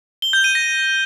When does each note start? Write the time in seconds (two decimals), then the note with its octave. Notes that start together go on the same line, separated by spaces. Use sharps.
0.22 G7
0.33 G6
0.44 D#7
0.55 A#6